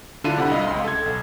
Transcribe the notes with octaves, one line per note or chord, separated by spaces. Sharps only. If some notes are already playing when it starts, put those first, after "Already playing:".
D3 D4 E4 F4 D#7
C3 F#5 B5
C2 D#5 F5
C#2 C6
A4 G#6
B1